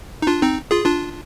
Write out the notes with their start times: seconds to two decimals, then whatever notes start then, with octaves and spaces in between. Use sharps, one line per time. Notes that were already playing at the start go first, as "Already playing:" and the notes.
0.22 D#4
0.27 D4 F4
0.42 C4 D#4
0.71 F4 G#4
0.85 D4 F4